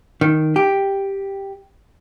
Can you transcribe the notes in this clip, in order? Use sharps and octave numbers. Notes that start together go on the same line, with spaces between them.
D#3
G4